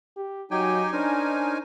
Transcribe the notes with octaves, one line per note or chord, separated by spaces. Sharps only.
G4
F#3 D#4 G4 G5 G#5
C#4 D4 A#4 C5